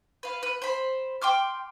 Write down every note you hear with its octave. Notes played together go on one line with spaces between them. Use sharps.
B4 F5
B4
C5 B5
G5 C6 D6 F6